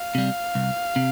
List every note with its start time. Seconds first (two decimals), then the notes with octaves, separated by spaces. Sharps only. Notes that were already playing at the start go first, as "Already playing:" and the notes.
Already playing: F5
0.15 C3 G3
0.55 C2
0.96 C3